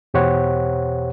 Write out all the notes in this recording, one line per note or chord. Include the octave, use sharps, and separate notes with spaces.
E2 B2 G4 C5 C#5 F#5